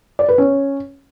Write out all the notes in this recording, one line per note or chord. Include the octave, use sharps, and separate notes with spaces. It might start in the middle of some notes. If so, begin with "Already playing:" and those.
D5
B4
C#4